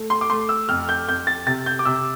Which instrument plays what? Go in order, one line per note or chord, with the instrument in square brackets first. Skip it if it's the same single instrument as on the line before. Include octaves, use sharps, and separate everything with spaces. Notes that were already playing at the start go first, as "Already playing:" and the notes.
Already playing: [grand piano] A3
C6
D6
A3 C6
E6
F2 F6
G6
F2 G6
A6
C3 A6
G6
D6
C3 E6